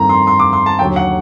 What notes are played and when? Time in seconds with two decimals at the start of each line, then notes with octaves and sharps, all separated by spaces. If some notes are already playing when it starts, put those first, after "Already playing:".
Already playing: G2 D#3 A3 C4 A#5
0.09 C6
0.27 C6
0.40 D6
0.53 C6
0.66 A5
0.79 D#2 D3 F#3 A3 G5
0.96 F#5